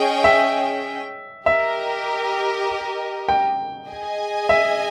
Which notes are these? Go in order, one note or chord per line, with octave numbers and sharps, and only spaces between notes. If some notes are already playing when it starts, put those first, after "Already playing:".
Already playing: C#4 G#4 D#5 G5
E5
G4 A#4 D#5 E5
G5
G#4 D#5 G#5
E5